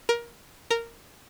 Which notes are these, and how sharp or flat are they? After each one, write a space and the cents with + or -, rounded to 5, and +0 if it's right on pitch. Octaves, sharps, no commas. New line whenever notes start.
A#4 +20
A#4 -10